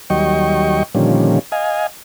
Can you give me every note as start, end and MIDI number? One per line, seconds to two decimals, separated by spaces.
0.10 0.83 39
0.10 0.83 54
0.10 0.83 55
0.10 0.83 75
0.10 0.83 79
0.10 0.83 85
0.95 1.39 46
0.95 1.39 50
0.95 1.39 51
0.95 1.39 53
0.95 1.39 55
0.95 1.39 61
1.52 1.87 75
1.52 1.87 77
1.52 1.87 80